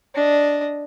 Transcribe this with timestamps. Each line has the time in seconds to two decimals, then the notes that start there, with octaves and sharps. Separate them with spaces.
0.15 D4 D#5